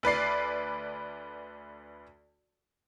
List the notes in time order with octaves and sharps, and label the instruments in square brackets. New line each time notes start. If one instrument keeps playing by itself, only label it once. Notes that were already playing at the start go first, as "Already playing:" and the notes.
[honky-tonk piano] D2 B4 D5 C7